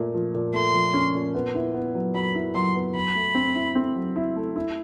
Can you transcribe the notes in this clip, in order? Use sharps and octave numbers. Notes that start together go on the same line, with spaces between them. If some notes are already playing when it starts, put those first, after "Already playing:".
Already playing: A#2 A3
F3
A#2
A3 C6
F3
C#4
A#2
B3
E4
B3
F#3
F#3 B5
E4
F#3 C6
B3
F#3 B5
A3
C4
E4
C4
F#3
E4
A3
E4